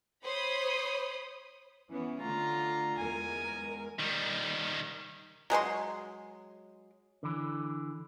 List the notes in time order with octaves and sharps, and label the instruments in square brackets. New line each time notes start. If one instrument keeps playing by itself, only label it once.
[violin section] C5 C#5 B5 D#6
[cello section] E3 B3 C#4
[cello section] D3 A3 [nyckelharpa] F4 A#5
[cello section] E2 G#3 A#4 [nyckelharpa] G#5
[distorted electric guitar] D#3 G3
[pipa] F#3 G#3 C5 C6
[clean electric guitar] D3 E3